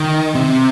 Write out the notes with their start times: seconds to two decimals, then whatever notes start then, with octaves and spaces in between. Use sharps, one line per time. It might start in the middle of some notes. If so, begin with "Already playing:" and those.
Already playing: D#3
0.35 C3